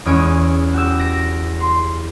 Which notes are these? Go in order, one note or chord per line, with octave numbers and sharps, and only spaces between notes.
E2 G#3 C#4 C#5 G#5 D7
F#4 G4 E6
A#6 D7
C6